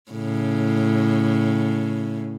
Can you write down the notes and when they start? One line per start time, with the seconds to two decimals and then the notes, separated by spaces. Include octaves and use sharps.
0.12 A2 C#3